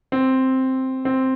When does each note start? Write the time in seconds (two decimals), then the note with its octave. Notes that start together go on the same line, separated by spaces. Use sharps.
0.12 C4
1.05 C4